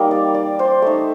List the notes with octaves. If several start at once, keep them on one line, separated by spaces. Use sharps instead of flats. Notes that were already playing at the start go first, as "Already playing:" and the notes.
Already playing: G3 A#3 D#4
D5
D5
C5
A3 D#4